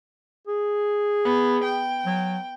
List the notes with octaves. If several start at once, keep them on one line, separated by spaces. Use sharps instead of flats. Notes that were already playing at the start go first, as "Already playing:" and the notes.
G#4
B3
G5
F#3